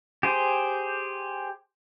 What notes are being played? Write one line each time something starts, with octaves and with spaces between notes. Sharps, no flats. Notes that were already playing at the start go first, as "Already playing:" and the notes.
G4 G#4 C5